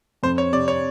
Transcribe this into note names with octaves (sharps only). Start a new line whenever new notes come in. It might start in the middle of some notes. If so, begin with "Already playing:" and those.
F2 C5
C#5
C3 D5
C#5